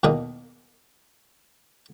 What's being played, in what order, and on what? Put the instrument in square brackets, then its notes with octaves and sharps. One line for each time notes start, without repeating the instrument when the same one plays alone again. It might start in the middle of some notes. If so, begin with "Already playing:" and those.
[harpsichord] E2 B2 D#3 A#3 D#4 D#6